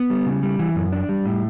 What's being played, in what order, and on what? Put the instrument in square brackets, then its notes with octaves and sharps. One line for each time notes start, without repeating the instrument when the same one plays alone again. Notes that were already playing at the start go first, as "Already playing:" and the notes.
Already playing: [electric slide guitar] B3
G3
C#3
G3
E3
F#2
D4
G3
A2